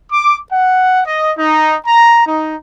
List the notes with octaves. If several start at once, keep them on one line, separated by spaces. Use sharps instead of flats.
D6
F#5
D#5
D#4
A#5
D#4